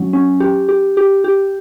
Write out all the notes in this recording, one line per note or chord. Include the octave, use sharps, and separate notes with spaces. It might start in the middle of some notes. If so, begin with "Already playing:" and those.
Already playing: F#3 C#4
C#4
G4
G4
G4
G4